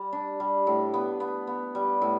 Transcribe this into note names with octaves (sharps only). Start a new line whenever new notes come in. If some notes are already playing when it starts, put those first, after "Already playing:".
Already playing: G3
D4
G3
A2
B3
B3
B3
G3
A2